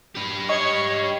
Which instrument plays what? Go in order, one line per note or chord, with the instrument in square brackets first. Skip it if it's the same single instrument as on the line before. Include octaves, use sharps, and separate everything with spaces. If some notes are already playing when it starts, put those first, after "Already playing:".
[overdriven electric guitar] G4 B4
[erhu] C#5 [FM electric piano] D#5 C#6